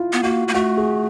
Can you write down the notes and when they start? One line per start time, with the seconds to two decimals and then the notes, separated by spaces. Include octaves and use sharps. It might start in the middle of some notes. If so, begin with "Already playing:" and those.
Already playing: E4 F4
0.13 B3
0.23 A#3 F#4
0.48 A#3
0.54 A3 F#4
0.77 G#4